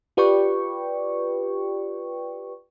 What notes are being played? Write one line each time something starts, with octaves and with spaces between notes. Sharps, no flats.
F4 G4 B4 D5 G5 C#6